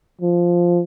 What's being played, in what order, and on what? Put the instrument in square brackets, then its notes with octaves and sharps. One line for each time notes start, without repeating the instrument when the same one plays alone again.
[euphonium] F3